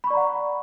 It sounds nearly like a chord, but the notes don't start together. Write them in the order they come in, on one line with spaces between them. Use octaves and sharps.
B5 C#6 D5 A#5 F#5